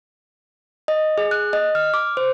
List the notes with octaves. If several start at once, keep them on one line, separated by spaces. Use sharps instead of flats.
D#5
G#4
F#6
D#5
F6
D6
C5